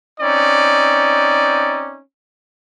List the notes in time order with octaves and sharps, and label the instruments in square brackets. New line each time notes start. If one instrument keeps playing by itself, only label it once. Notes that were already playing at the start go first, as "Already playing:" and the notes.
[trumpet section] C4 C#4 D#4 D5